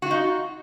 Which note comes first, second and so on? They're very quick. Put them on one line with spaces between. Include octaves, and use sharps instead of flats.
F#4 F4 D#4